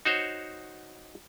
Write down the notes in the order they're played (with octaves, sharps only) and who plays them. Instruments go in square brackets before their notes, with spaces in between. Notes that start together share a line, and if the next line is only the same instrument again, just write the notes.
[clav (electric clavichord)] D#4 F#4 C5 C#5